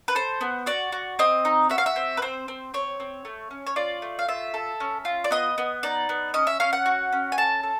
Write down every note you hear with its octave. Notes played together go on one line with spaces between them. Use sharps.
B4
A4 C5
B3
F#4 D5
F#4
C4 D#5
D#4
F#4 E5
F5
E5
C4
B4
C4 C5
C4
C4 C#5
C4
A3
C#4
C#5
F4 D5
A3
F5
F4 E5
A4
C#4
F4
D5
B3 D#5
B3
D#4 D5
B3
C#4 D#5
E5
C#4 F5
F#5
F#4
C#4
G#5
A4 A5
A4